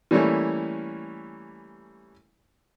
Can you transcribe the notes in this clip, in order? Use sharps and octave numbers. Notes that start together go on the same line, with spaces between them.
E3 G3 A3 A#3 C#4 E4